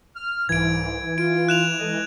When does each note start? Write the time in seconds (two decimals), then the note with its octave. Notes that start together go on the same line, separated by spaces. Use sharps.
0.16 F6
0.49 C2 G#2 E3 G#6 D7
1.18 F4 D7
1.48 F#6 E7 F7
1.79 G#3 A4 D#5